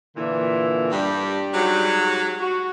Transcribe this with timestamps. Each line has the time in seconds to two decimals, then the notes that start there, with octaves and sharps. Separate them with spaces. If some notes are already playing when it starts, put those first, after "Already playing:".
0.17 A#2 D3 E3
0.91 G2 G3 G4
1.54 G#2 F#3
2.40 F#4